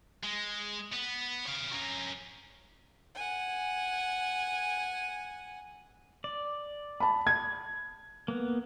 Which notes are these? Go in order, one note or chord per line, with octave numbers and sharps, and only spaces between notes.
G#3
B3
C#5 F5
C#4 A#4
F#5 G#5
D5
A5 B5
G#6
A#3 B3